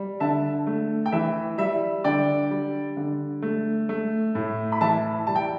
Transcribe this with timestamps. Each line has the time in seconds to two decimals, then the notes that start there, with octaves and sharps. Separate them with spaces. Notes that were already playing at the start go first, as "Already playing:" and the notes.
Already playing: G3
0.20 D3 E5 A5
0.67 A3
1.06 G5
1.12 E3 E5
1.58 G3 E5
2.04 D3 D5 G5
2.50 G3
2.97 D3
3.42 A3
3.89 A3
4.35 A2
4.72 B5
4.81 E3 E5 A5
5.27 G3 A5
5.36 G5